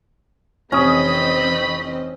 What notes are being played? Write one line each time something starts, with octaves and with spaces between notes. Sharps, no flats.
F1 E3 C4 C#4 D#5 B5 D#6